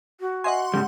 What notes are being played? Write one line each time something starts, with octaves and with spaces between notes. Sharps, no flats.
F#4
D#5 E5 F#5 G#5 C6
G#2 C#3 G3 G6